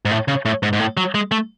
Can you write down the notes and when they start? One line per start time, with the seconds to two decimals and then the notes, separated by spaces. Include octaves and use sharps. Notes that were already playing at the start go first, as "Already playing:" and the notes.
0.05 G#2
0.11 A2
0.28 C#3
0.45 A2
0.63 G#2
0.73 G#2
0.80 A2
0.97 F#3
1.15 G#3
1.32 A3